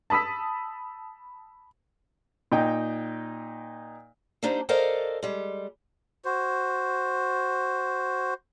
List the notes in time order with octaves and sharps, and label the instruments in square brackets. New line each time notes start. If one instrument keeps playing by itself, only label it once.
[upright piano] A5 B5 D#6 E6 B6
[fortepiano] A#2 D#4 G5
[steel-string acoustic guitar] G3 A#3 D4 D#4 C5
A4 A#4 C5 D5 D#5 F5
G3 G#3
[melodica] F#4 C5